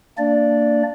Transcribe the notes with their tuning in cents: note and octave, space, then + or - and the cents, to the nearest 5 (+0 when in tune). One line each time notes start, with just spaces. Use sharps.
A#3 -25 D4 +0 D5 -5